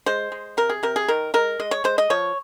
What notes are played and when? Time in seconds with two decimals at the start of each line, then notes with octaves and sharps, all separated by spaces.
0.06 G#3 C5
0.32 G#3
0.57 C3 A#4
0.70 G#4
0.83 C3 A#4
0.96 G#4
1.08 D#3 A#4
1.34 G#3 A#4
1.60 G#3 D#5
1.71 C#5
1.84 G#3 C5
1.98 D#5
2.10 F3 C#5